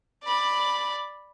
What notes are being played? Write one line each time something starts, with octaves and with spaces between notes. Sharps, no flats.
D5 B5